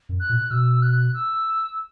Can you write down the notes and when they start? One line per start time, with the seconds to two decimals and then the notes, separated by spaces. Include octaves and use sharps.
0.09 F#2
0.20 F#6
0.29 A#2
0.50 B2 E6
0.82 F#6
1.14 E6